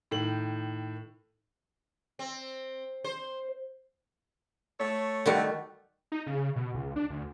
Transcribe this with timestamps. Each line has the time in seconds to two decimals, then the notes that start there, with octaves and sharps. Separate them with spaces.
0.11 A2 D#3 F#7
2.19 C4
3.04 C5
4.80 A3 A4 C#5
5.26 D#3 G3 A3 F#4
6.12 D#4
6.26 C#3
6.56 B2
6.74 C#2
6.96 D4
7.10 D2